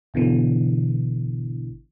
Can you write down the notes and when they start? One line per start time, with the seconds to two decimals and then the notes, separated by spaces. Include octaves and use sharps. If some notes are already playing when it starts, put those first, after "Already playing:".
0.14 G#1 B2 D3 E3